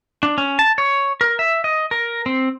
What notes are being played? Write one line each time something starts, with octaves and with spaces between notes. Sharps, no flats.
D4
C#4
A5
C#5
A#4
E5
D#5
A#4
C4